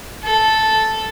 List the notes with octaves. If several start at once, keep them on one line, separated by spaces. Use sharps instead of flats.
A4